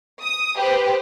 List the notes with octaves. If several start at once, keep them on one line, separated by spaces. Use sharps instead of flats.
D#6
G4 B4 C5